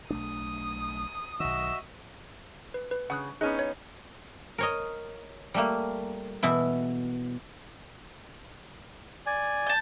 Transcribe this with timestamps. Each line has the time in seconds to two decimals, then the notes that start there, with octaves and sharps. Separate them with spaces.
0.10 B1 A3 D4 D#6
1.40 B1 D#3 F#4 D#5 E5 E6
2.74 B4
2.91 B4
3.10 C#3 F#5 D#6 F#6
3.41 B3 C#4 D#4 G#4 F#6
3.59 C#5
4.58 A#4 C#5 D#5
5.54 G3 A3 A#3
6.43 B2 E3 E4
9.26 D5 G#5
9.67 A5 G6